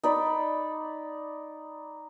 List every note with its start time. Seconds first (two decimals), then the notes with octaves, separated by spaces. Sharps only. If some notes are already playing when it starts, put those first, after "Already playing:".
0.03 D#4 D5 B5